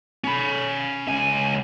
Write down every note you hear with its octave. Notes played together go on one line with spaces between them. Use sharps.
C#4 B5
C#2 G#5